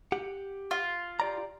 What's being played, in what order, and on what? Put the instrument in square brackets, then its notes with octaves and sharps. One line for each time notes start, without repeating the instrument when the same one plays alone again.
[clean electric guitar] G4 F#5
[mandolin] F4
[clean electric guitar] G4 D5 A#5